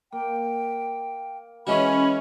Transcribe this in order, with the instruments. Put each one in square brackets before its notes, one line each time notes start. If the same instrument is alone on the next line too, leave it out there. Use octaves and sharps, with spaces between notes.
[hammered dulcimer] A#3 [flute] G5
[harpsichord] E3 G#3 F#4 [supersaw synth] C#4 [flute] B5